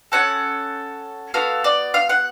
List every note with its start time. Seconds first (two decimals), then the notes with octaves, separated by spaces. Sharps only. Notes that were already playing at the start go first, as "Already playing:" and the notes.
0.12 C#4 F#4 A4 F#5
1.34 B3 F#4 A4 F5
1.64 D5
1.94 F5
2.09 F#5